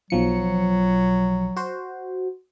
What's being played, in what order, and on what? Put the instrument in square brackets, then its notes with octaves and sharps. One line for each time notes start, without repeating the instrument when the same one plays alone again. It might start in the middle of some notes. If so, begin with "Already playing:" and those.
[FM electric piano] B1 F3 C#7 [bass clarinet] F#3
[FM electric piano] F#4 C5